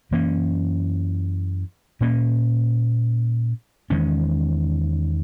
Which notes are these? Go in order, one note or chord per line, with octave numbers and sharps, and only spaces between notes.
F#2 E3 A#3 C#4
A#2 A#3 C#4
E2 D#3 G#3 C#4